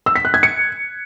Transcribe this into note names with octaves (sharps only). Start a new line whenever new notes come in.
E6
B6
F#6
G#6
C#7